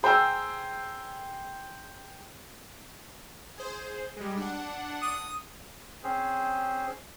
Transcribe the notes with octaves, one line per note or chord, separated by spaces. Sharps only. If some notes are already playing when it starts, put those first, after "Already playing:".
G#4 C5 G5 G#5 A#5 E6
G#4 C5
G3 G#3
D4 F#5
D#6
C4 C#4 G#4 C5